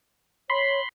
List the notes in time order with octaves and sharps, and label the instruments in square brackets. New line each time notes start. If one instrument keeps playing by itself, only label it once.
[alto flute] C#5 [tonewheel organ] B5 C6